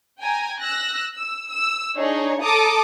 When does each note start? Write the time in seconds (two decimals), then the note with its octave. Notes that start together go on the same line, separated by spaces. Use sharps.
0.21 G5 G#5 A#5
0.59 E6 F#6 A#6
1.15 E6
1.50 E6
1.97 D4 D#4 G#4 C#5
2.41 A4 A5 A#5 D6 D#6